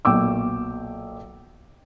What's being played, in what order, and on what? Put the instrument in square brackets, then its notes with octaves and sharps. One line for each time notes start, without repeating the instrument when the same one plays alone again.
[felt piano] B1 A#2 G5 D6 E6